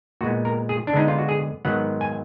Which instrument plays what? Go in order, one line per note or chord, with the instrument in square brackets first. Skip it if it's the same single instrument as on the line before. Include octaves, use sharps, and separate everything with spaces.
[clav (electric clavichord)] A#2 G#3 B3 F#4
A#4
G#4
D4
D3 G#3 B3 D#4
F4
F#4
G#4
G#2 D#3 F#3 B3 F#5
G#5